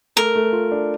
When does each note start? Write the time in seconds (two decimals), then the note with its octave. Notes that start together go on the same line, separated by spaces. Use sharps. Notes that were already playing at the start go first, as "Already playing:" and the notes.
0.16 A3 A#4
0.36 A3
0.53 F4
0.72 D4